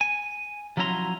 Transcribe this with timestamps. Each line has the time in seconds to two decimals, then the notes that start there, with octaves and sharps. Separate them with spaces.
0.01 G#5
0.77 F3 F#3 C#4 E4 A#5 C6